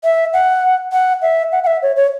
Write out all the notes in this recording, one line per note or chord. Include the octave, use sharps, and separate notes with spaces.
E5
F#5
F#5
E5
F#5
F#5
E5
C#5
C#5